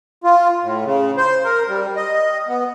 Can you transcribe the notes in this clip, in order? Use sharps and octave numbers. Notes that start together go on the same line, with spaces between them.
F4
A2
C#3
C5
A#4
G3
D#5
B3